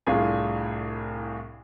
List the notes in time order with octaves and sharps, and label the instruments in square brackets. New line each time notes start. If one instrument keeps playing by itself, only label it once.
[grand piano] C2 A2 D4 F4 G#4 G#5